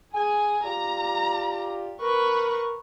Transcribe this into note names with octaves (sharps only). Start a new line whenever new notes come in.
G#4 G#5
F4 G4 D5 A#5
A#4 B4 C#6